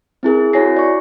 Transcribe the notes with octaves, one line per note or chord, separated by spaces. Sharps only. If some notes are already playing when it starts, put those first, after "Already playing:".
C4 E4 G#4 A#4
E4 F#4 C#5 G#5 A#6 C7
D5 C#6